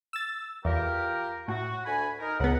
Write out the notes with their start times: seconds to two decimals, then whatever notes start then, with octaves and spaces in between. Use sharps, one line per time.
0.13 E6 A6
0.65 E2 F4 G4 A#4
1.48 A2 F#4
1.85 D2 G#5 B5
2.20 D#4 A#4
2.40 C#2 B3 F#5